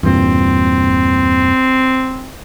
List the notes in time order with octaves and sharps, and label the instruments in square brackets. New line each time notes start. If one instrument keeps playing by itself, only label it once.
[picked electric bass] E2 G2 A#2 [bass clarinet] C4